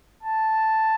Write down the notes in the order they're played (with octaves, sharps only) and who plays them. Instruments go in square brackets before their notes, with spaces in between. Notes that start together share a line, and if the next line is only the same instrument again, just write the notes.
[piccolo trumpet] A5